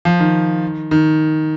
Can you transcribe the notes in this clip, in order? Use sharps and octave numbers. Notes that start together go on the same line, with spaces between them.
F3
D#3
D#3